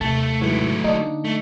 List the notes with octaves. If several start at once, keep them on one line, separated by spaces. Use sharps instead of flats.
D#2 C3 A3 A5
G#2 E3 F#3 A3
D3 A#3 D4 D#4
A3